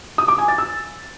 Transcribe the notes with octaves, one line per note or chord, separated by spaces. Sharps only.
D#6
D6
G#5
A6
E6